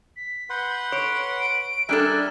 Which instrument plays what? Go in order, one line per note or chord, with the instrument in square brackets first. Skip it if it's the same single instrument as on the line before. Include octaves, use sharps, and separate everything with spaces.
[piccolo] B6
[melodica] B4 F#5 C6 [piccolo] G6
[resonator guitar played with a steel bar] C#5 [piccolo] D7
[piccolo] D7
[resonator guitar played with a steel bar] G3 D4 A4 [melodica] A#4 E5 G#5 [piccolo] F#6